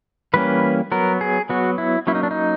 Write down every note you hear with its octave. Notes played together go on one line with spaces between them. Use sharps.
E3 G3 A#3 C#4 B4
F#3 B3 A#4
G#4
F#3 B3 F#4
E4
F#3 A#3 C#4 E4
D#4
D4
D#4